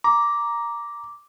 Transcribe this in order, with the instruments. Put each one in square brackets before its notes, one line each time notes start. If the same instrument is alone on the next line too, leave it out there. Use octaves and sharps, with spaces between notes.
[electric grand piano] A#5 [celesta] D6